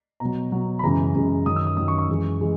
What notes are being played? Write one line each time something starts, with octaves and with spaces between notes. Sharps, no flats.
B2 F#3 A#5
B2 F#3
B5
F#2 C#3 E3 G#3 A#5
F#2 C#3 E3 G#3
F#2 D#3 F#3 D#6
E6
D#6
F#2 D#3 F#3 D#6
C#6
C#6
F#2 E3 G#3
E3 G#3